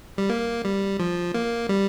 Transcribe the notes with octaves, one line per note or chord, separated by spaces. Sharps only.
G3
A#3
G3
F3
A#3
G3